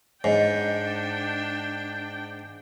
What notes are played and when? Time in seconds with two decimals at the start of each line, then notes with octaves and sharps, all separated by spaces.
0.24 G#2 D4 C#5 D#5 G5